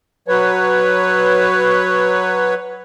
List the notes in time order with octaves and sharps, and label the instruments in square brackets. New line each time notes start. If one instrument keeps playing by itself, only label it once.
[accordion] F#3 B4 C#5